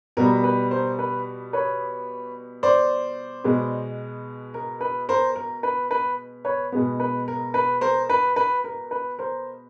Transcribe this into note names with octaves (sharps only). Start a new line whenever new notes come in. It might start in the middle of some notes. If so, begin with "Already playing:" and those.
B2 G3 B3 A#4
B4
A#4 C5
B4
B4 C#5
C5 D5
B2 G#3 B3
A#4
B4
A#4 C5
A#4
B4
B4
B4 C#5
B2 G#3 B3
B4
A#4
B4
A#4 C5
B4
B4
A#4
B4
A#4 C5